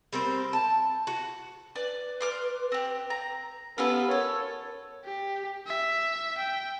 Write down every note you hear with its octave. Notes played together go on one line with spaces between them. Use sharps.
G3 C4 A#4 C5
A5
F#4
B4 D5
C6 D6 F6
C4 G4
A#5
B3 C#4 F4 G4 A4
A4 A#4 C#5
G4
E5
G5